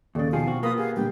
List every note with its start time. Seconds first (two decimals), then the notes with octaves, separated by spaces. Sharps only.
0.15 D#1 D#2 C#3 A4 D5
0.33 B2 D#3 F3 G#4 F5
0.47 C4 F#4
0.63 A#3 B3 F4 B4 D#6
0.77 G4 G#4 F5
0.97 A#2 D3 G3 G5